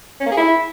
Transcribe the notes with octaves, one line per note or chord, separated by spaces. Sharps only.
C#4
A#3
G#4
E4